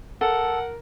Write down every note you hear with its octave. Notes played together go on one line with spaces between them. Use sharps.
A4 A#4 F#5